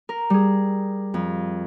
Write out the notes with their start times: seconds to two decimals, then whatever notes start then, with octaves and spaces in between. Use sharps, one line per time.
0.09 A#4
0.30 G3 G#4
1.14 F2